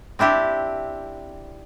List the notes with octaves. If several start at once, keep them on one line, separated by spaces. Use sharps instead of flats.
C4 D4 E4 G4